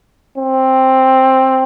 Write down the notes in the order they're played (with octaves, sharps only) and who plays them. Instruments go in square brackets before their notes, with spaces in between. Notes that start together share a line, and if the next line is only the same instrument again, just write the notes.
[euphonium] C4